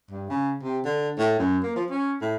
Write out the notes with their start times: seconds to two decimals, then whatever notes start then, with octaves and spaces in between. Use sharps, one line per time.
0.11 G2
0.30 C#3
0.63 C3
0.85 D3
1.18 A2
1.39 F#2
1.63 A#3
1.76 F3
1.90 C#4
2.21 A2